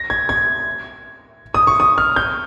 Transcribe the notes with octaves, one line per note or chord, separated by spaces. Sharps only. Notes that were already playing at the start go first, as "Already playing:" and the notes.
Already playing: A#6
G#6
G#6
D#6
C#6
D#6
F6
G6